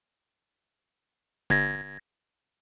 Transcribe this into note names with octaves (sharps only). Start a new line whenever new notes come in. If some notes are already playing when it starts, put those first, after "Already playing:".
G1 G#6 A#6